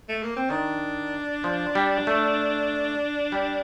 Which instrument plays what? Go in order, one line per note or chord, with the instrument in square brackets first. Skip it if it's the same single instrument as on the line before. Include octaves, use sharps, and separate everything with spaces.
[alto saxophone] A3
A#3
C4
[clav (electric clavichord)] D#3 [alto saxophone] D4
[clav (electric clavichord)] F3
G3
A3
G3